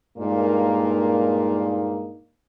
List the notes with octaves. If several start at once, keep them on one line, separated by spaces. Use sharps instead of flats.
G2 A#2 G#3 A#3 D#4